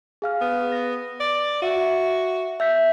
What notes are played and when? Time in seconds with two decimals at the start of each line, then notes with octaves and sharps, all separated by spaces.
0.22 G#4 F5 F6
0.41 B3
0.72 A#6
1.20 D5
1.62 F#4 E5 F#5
2.60 E5 G6 B6